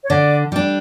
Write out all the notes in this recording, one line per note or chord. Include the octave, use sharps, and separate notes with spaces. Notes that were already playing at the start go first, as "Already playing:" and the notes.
C#5
D3 D5
G3 D4